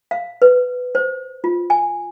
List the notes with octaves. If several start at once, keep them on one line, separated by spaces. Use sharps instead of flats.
F5
B4
C5
F4
G#5